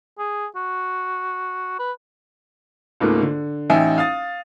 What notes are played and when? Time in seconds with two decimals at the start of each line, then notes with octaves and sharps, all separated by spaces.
0.19 G#4
0.56 F#4
1.79 B4
3.00 C#2 G#2 A3 A#3
3.22 D3
3.70 A1 D#4 E5 G5 G#5
3.98 F5 D#6 A6